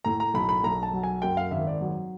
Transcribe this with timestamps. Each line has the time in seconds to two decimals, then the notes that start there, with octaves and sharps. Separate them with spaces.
0.05 A2 A#5
0.20 A#5
0.34 B1 B5
0.49 B5
0.63 B1 A#5
0.83 A5
0.93 F#3
1.03 G#5
1.22 F#2 G5
1.37 F5
1.51 G#1 E5
1.67 D5
1.81 F#3